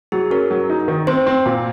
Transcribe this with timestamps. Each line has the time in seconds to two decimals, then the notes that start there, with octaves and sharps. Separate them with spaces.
0.12 F#3 G#4
0.30 C#4 A#4
0.51 F#3
0.69 D#4
0.88 D#3
1.07 C4 C5
1.26 C4
1.46 A#2